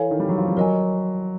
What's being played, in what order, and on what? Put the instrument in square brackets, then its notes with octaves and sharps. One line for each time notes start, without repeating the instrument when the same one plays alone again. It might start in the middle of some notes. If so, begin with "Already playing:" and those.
Already playing: [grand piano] E3 [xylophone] A4 C#5 F5 G#5
[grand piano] D#3
G3
F#3
F3
G3
[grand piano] F#3 [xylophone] A#4 D#5 G#5